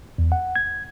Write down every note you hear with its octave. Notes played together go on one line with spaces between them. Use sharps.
E2
F#5
G#6